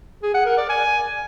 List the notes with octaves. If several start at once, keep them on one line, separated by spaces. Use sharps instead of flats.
G#4
F#5
A#4
D5
G#5